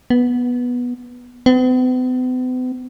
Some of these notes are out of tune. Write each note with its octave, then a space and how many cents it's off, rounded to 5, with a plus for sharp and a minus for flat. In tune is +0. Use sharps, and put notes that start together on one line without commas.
B3 -10
B3 +45